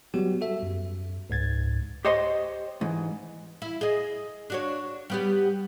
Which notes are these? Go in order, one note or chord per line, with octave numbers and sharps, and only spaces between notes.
F#3 G3 B3 F#4 G4
F#4 A4 E5
F#2
C#2 G#2 G#6 A6
G4 C5 C#5 D#5 C6
G#2 E3
E4
G#4 D#5
D4 F#4 C#5
G3 B3 G4